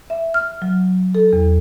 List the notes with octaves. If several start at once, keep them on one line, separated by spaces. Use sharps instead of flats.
E5
F6
F#3
A4
E2